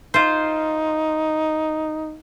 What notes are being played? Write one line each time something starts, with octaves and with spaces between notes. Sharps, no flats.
D#4 F4 C5